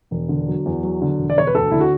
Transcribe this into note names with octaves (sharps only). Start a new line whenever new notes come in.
E1
D3
F#3
E2
F#3
D3
E1
D5
E1 C#5
B4
D2 A4
D3 E4
F#4